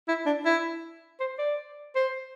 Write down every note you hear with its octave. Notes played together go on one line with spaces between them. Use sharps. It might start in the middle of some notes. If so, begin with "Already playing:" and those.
E4
D4
E4
C5
D5
C5